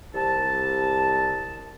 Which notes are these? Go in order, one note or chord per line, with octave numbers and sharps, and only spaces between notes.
C2 A5